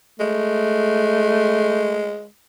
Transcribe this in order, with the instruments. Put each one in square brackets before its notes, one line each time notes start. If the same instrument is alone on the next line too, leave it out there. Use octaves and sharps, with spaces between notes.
[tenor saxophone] G#3 [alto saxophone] A3